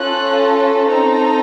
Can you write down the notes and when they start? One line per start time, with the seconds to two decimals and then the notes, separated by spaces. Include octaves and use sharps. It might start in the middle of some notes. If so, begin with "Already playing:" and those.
Already playing: C#4 F4 A4 F#6
0.40 A5
0.88 C4 D#4 A4 A#5